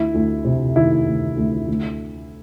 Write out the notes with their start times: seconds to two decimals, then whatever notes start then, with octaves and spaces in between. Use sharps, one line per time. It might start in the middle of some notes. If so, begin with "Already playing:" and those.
Already playing: D2 E4
0.14 D2
0.45 C3
0.76 D#3 E4
1.06 D2
1.37 D2
1.68 D2